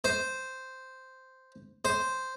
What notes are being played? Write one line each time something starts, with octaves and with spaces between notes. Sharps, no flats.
C5
C5